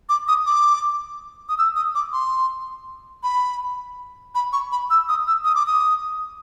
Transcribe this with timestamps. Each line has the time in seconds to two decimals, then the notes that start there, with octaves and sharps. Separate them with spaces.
0.09 D6
0.28 D#6
0.47 D6
1.49 D#6
1.58 E6
1.76 D#6
1.95 D6
2.13 C6
3.23 B5
4.35 B5
4.53 C#6
4.72 B5
4.90 E6
5.09 D#6
5.27 E6
5.45 D#6
5.55 D6
5.67 D#6